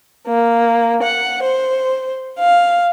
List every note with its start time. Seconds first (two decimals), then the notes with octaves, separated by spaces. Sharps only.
0.27 A#3
1.02 F#5
1.43 C5
2.38 F5